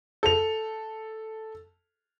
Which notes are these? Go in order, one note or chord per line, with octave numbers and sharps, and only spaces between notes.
A4 F7